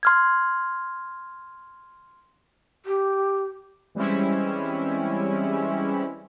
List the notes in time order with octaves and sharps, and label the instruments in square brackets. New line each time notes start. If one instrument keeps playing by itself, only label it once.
[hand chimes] C6 F6 G#6
[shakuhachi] G4
[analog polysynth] E3 G3 G#3 C4 C#4 E4